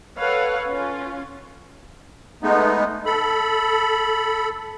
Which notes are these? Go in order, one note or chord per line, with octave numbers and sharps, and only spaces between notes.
A4 B4 C#5 F5 F#5
C#4 F4
G#3 A3 B3 D#4
A4 B5